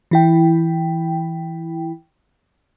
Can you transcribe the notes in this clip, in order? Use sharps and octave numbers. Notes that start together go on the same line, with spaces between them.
E3 E4 G5